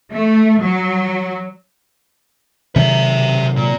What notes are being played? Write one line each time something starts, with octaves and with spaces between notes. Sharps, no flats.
A3
F#3
C3 D#3 F#3 G4 E5
A#2